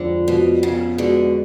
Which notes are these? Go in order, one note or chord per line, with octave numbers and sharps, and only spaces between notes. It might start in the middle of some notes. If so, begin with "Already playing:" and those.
Already playing: F2 D3 F3 G#3
F2 B2
C#3 B3
B2 D3 G#3